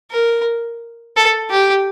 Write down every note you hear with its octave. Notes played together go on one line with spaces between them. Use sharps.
A#4
A4
G4